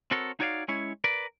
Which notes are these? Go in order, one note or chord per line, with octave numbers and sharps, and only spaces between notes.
C4 F#4 A4 A#4 C#5
D#4 F#4 C#5 D5 E5 F5
G#3 C#4 E4 C#5
A#4 B4 D5